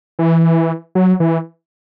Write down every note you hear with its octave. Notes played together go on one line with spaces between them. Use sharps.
E3
F#3
E3